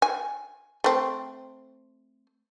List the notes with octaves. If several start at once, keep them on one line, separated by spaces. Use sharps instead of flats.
G#5
A3 C4